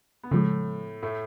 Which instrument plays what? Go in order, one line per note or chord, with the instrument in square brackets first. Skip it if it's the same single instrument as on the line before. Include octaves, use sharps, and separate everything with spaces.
[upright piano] B3
[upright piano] A2 A3 [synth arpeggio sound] C#3 F3 G#3
[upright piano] A2 A3